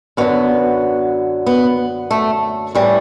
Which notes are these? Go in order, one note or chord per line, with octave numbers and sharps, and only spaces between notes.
F#2 D3 F#3 B3
B3
A3
A2 E3 G3